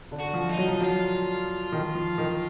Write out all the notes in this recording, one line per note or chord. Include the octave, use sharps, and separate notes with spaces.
D3
F#4
F3
D#4
F#3
F3
F#3 F4
D#3
F3
D#3